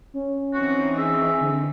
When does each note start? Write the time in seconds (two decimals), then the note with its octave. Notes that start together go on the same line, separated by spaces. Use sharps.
0.14 C#4
0.54 E3 C4 D#4 F#4
0.98 G#4 E5
1.41 D3